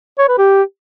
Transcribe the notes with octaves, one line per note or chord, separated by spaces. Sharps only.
C#5
B4
G4